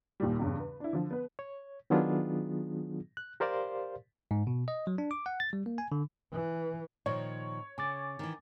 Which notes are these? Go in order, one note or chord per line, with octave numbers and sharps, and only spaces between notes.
D#2 A#2 D#3 G3
E2 G2 C#3
B4
D4 E4
D3 F3
B3 B4
C#5
D#3 F#3 B3 D4 F4 G#4
F#6
G4 A#4 C5 D5 F5 C6
G#2
B2
D#5
F#3
D4
D6
F#5
A6
G3
A#3
G#5
D3
E3
A#2 D#3 F3 C#5
C#3 G#5 D6 A6
D#3 E3